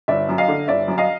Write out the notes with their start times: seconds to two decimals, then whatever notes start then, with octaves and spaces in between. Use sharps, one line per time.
0.08 G1 D5 E5
0.29 F#2
0.38 D#5 F5
0.48 D3
0.68 G1 D5 E5
0.88 F#2
0.98 D#5 F5